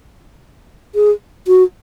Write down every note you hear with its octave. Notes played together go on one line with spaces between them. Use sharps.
G#4
F#4